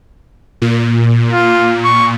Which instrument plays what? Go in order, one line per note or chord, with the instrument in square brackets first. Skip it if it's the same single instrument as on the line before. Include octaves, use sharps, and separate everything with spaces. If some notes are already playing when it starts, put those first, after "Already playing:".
[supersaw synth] A#2
[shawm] F4
C#6